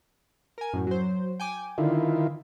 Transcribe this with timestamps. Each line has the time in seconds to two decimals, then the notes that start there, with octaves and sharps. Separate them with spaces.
0.58 A#4 G#5
0.73 F#2 A2
0.87 F#3 C5
1.40 G5 G#5 D6
1.78 D3 D#3 E4 F4